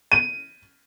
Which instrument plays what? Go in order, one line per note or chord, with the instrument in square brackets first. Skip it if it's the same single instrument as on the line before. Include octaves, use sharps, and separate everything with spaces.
[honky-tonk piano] D#7